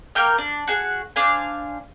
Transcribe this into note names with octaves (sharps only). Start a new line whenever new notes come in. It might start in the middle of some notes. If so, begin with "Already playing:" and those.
A#3 A#4 G5 F6
D4
F#4 G#4 F#5
D4 C5 F5 G#5